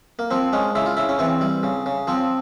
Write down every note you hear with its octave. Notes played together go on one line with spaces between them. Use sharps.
A#3
F3 C4
G#3 C#4
C#3 E4
F4
C#3 E4
C#4
E3 C4
G3
C#3
C#3
F3 C4